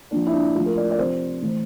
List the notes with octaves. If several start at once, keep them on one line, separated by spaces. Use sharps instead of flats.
A#2 F3 D4
E4
D4
A2 F3 F4
A#4
D5
D5
C3 F3 C5
A2 E3